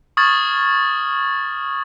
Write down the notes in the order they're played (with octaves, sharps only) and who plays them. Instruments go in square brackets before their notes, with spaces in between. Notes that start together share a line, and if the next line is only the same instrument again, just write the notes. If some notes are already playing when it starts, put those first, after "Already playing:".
[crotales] C#6 D#6 F6 G#6 A6 F#7